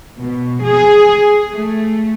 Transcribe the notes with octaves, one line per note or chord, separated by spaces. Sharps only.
B2
G#4
A3